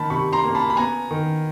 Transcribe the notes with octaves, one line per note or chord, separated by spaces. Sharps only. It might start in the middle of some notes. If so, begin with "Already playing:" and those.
Already playing: D#3 A#3 A5 B5
C3 B5 C#6
A#5 C6
A#3
A5 B5
B5
B3 G#5 A#5
D#3